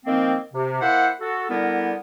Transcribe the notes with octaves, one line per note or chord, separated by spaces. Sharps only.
D#3 F3 A#3 C4
C3
A#3 E4 C5 E5 F#5
F#4 A4
D3 G3 B3 E4 A#4